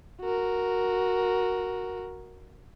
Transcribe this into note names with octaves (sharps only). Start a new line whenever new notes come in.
F#4 A#4